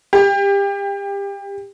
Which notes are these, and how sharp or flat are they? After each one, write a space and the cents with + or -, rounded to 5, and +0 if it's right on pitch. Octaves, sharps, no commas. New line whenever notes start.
G4 +25